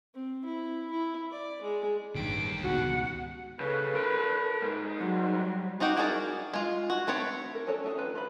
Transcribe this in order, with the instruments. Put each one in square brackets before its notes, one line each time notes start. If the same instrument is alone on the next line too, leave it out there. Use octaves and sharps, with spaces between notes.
[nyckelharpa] C4
E4
E4
D5
G#3
[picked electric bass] A1 G2 [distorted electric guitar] D#3 G4 [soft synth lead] D7
[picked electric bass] C#2 G#2 B2 [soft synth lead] F#4 [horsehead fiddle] F#5
[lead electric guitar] C#3 [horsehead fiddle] A4 B4
[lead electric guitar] A#4 B5
G#2
[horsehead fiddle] F#3 G3
[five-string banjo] C4 D#4 F#4 G4
E4 F#4 G#4 A#4 D5
G#3 F4
F#4
A3 C4 B4 C#5
A#4
C#4 D4 A4 C#5 A5
A3 C#4 D4 G#4 A4
D#3 F4 B4
F4 B4 B5